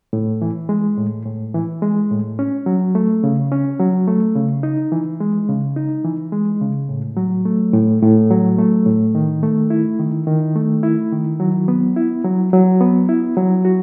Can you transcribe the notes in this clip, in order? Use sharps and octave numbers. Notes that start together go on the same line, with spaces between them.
A2
E3
G#3
A2
A2
E3
G#3
A2
C#4
F#3
A3
C#3
C#4
F#3
A3
C#3
D#4
E3
G#3
C#3
D#4
E3
G#3
C#3
A2
F#3
A3
A2
A2
F#3
A3
A2
D#3
A3
E4
D#3
D#3
A3
E4
D#3
F#3
B3
E4
F#3
F#3
B3
E4
F#3
F#4